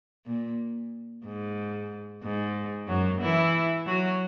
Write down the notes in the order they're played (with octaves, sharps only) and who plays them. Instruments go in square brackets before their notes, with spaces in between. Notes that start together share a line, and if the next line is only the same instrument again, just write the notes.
[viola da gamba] A#2
G#2
G#2
F#2 F#3
E3 E4
F#3 F#4